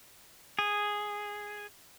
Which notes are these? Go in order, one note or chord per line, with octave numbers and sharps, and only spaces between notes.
G#4